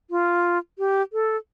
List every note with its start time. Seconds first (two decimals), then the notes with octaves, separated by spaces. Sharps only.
0.10 F4
0.78 G4
1.13 A4